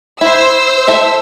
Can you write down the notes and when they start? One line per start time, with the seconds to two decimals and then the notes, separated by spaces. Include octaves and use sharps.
0.21 E4 C5 E6
0.87 E4 A4 E5